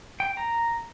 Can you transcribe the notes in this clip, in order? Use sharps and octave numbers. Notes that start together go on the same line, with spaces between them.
G5
A#5